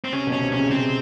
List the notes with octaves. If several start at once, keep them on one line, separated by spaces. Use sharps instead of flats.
C4
C3 C#4
B2
C#4
C3
C#3 C#4
C#3 C4